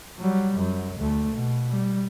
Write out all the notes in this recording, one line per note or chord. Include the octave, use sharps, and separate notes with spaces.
F#3 G3
F#2
D2 A3
B2
G3